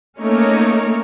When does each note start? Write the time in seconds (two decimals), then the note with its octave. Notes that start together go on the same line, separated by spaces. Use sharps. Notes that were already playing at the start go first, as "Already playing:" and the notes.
0.19 A3 A#3 C#4 D#4 A#4 C#5